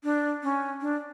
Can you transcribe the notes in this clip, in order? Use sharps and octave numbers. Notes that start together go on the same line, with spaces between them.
D4
C#4
D4